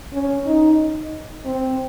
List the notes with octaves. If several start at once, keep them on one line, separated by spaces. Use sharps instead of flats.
C#4
D#4
C4